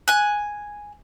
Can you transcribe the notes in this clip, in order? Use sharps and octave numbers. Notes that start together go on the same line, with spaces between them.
G#5 F#6